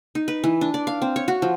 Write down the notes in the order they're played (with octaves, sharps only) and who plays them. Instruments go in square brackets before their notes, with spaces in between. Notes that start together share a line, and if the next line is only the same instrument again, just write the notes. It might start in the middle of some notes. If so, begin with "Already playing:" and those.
[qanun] D#4
B4
E3
D4
D5
F5
C4
C#5
F#4
F3